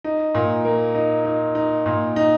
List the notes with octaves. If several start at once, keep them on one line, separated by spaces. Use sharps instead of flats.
D#4
A#2
A#3
D#4
D#4
D#4
A#2
D#4